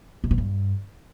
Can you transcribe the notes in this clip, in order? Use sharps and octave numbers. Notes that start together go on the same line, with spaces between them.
C3
B2
G2